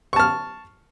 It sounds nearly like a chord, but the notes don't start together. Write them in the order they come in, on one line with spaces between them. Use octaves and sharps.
C#6 A5 F6